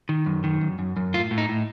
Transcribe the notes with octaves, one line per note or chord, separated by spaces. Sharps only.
D#3
F#2
D#3
F#2
F#2
F#2
A2 F4
A2
D#4
A2